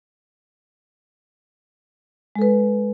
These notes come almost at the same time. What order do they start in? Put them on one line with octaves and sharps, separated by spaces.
G#3 A4 B4